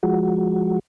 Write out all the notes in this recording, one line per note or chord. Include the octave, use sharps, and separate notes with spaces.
F3 G#3 F#4